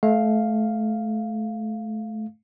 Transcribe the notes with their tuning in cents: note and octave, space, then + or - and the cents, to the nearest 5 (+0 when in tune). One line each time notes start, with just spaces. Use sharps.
A3 -25 F5 +0